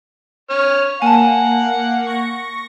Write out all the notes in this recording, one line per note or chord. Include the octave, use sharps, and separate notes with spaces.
C#5 F6
A#3 F#5 G#5 A5
C#6 A#6